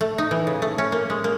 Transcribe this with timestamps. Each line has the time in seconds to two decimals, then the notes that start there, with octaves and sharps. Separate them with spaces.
0.01 A3
0.18 D#4
0.31 E3
0.47 C#3
0.62 A3
0.78 C#4
0.92 A#3
1.10 G#3
1.24 A#3